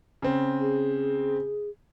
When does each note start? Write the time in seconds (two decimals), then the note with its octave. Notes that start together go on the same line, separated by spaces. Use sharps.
0.22 C#3 C4
0.61 G#4